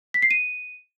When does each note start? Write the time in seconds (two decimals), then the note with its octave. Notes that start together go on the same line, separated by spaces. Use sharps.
0.14 B6
0.22 C7
0.31 D#7